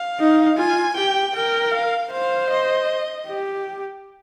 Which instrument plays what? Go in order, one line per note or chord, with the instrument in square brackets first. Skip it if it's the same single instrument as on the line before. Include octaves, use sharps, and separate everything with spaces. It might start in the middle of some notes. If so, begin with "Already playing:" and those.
Already playing: [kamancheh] F5
[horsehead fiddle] D#4
[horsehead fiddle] F4 [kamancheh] G#5
[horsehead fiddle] G4 [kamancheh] G5
[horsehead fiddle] A#4 [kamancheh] G5
[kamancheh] F5
[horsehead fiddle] C5 [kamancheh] F5
[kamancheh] D#5
[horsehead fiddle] G4